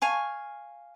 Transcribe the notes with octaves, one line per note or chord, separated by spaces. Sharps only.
F5 G#5 C#6